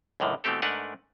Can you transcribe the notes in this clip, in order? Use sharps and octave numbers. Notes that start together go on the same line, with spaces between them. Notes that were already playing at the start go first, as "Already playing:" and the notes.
C#2 F#2 A2 D3 D#3
B2 E3 A3 C4 G4 A4
G#2 A3 D4 A#4 B4 F#5